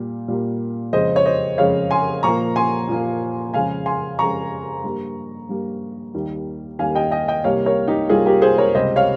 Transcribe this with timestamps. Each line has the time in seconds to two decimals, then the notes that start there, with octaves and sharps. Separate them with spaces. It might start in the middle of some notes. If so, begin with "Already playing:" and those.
Already playing: A#2 G3 A#3
0.28 A#2 G3 A#3
0.93 F2 C#3 G#3 C5 D#5
1.16 C#5
1.26 C5 D#5
1.58 F2 C#3 G#3 C#5 F5
1.91 G#5 C6
2.23 A#2 F3 A#3 A#5 C#6
2.56 G#5 C6
2.89 A#2 F3 A#3
3.53 F2 C#3 G#3 F5 G#5
3.86 G#5 C6
4.19 F2 C#3 G#3 A#5 C#6
4.84 G2 G3 A#3
5.49 G2 G3 A#3
6.14 D#2 D#3 G3 A#3
6.79 D#2 D#3 G3 A#3 F5 G#5
6.95 D#5 G5
7.11 D#5 G5
7.28 D#5 G5
7.44 C2 C3 G3 A#3 C#5 F5
7.66 A#4 C#5
7.88 D#4 G4
8.09 C2 C3 G3 A#3 F4 G#4
8.26 G4 A#4
8.42 G#4 C5
8.58 A#4 C#5
8.74 C#2 C3 G3 C5 D#5
8.96 C#5 F5